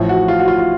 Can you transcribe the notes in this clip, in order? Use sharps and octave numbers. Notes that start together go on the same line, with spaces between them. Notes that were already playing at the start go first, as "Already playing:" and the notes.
Already playing: A1 A2 F3
F#4
F4
F#4
F4
F4